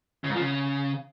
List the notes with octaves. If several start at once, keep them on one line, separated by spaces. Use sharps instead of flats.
C#3
G#2
F3
C#3